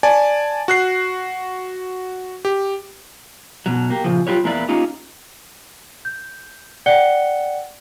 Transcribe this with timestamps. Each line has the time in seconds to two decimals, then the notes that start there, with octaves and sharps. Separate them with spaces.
0.03 D5 G#5 A5
0.68 F#4 F#6 C7
2.45 G4
3.66 F#2 B2 F#3
3.90 A#3 G4
4.04 A#2 C#3 F3
4.27 F#3 F4 G4 B4 C#5
4.44 E2 A#3 E4 B4 D5
4.69 A#3 C#4 D#4 F4 G4
6.05 G6
6.86 D5 F#5 G5 F#6 C#7 G7